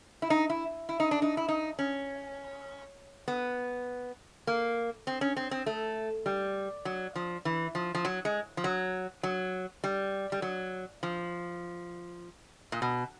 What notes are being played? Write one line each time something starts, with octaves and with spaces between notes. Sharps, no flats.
E4
D#4
E4
E4
D#4
D4
D#4
E4
D#4
C#4
B3
A#3
C4
C#4
C4
C4
A3
G3
F#3
F3
E3
F3
F3
F#3
G#3
F3
F#3
F#3
G3
G3
F#3
F3
A#2
B2